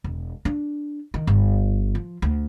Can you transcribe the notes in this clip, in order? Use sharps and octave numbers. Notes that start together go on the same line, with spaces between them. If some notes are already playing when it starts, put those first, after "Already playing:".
E1
D4
D#3
G1
F3
D2